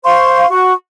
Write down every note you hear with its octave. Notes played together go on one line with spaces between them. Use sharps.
C5 F5 C6 C#6
F#4 C#6